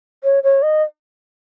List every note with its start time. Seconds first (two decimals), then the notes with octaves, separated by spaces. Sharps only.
0.24 C#5
0.43 C#5
0.62 D#5